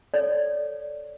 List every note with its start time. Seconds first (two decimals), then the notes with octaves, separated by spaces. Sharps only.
0.14 A4 C#5 D5